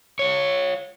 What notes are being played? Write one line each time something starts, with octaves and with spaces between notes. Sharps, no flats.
F4 C#5